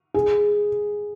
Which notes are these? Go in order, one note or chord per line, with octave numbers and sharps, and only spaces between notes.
G#4